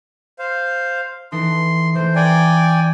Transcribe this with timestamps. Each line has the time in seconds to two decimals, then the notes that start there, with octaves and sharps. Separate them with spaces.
0.39 C5 F5
1.32 E3 D#4 A4 C6
1.95 E3 A3 C5
2.16 D5 G5 G#5 A#5 C#6 F#6